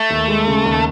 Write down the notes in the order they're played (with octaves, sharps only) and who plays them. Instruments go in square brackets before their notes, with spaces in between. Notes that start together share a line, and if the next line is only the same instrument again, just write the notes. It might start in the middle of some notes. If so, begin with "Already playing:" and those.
Already playing: [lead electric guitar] A3
[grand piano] D#2
G#3
C#3
D#2